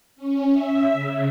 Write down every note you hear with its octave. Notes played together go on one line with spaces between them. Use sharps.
C#4
E5
C#3